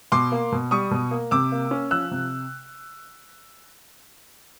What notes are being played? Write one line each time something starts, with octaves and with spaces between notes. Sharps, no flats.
B2 C6 D6
A#3
B2
G3 C#6 D#6
B2
A#3
C3 D6 E6
A#3
C#4
F3 E6 F#6
C3